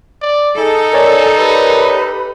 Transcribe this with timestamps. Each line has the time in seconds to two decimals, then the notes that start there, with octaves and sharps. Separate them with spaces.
0.21 D5
0.58 D#4 G#4 A4 G#5
0.93 A#4 C#5 D5 G#5
1.36 G4 B4 B5